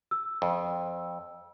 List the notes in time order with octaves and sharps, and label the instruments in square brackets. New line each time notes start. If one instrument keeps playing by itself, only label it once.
[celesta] E6
[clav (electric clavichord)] F2